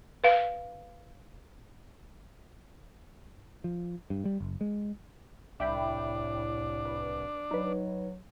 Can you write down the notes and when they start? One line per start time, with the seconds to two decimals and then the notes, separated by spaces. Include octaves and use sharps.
0.24 B4 F5
3.64 F3
4.10 G2
4.25 G3
4.40 F#1
4.61 G#3
5.60 C2 A2 D4 E5 G5 B5
6.85 B4
7.51 F#3 D#4 B4